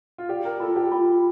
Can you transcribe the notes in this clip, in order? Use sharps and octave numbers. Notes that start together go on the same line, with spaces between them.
F4
G4 D5
A#4
F4 A4
G4
F4